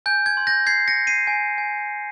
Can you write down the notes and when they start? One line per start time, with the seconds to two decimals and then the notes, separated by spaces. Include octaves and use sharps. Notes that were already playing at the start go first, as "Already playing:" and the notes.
0.06 G#5 G6
0.26 G#6
0.37 C6
0.47 G6 A#6
0.66 G6 G#6 C7
0.88 A#6 C#7
0.97 G6
1.07 C7 D#7
1.27 G#5
1.58 G#5